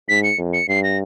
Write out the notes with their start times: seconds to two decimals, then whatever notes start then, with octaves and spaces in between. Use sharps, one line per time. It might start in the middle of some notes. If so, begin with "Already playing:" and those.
0.09 G#2 B6
0.24 C#7
0.38 F2
0.53 C#7
0.68 G2 C7
0.84 A#6